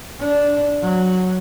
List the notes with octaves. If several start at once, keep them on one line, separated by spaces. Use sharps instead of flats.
D4
F#3